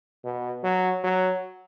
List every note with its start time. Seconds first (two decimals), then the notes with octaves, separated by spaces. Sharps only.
0.24 B2
0.64 F#3
1.04 F#3